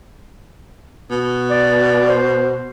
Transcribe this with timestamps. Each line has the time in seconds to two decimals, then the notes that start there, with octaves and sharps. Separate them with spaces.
1.11 B2
1.50 D5
2.08 C5